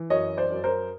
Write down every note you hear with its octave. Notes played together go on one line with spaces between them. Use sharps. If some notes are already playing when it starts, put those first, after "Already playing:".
Already playing: E3
F#2 C#5 D#5
C5 D5
F#2
A#4 C5